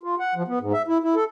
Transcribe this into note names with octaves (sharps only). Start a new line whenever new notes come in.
F4
F#5
F3
B3
G#2
E5
E4
E4
A4